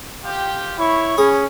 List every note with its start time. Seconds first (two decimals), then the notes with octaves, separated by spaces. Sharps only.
0.25 F4 G4
0.78 E4 C#5 B5 C#6
1.18 C#4 G#4